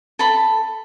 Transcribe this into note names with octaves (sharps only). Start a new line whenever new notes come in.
A4 B5